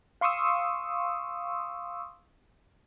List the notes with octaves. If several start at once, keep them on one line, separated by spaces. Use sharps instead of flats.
F5 C6 C#6 D#6 E6